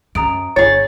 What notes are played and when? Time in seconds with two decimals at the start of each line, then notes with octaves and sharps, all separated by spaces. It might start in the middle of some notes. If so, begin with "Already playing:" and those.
0.15 F#2 A#5 D#6 D7
0.56 G1 G#4 C#5 A6